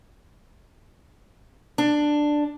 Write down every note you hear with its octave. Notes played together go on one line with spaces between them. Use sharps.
D4